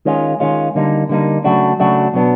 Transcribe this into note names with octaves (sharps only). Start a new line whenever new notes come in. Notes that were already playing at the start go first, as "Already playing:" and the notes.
D#3 G#3 C#4 F4
D#3 G#3 C#4 F4
D3 G3 A#3 D#4
D3 G3 A#3 D#4
C#3 F#3 A3 D4 F#4
C#3 F#3 A3 D4 F#4
B2 F#3 B3 D4